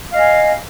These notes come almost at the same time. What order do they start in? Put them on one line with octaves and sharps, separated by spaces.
F5 D#5 G#5